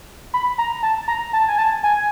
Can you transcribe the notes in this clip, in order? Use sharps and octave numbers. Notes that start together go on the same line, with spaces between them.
B5
A#5
A5
A#5
A5
G#5
A5
G#5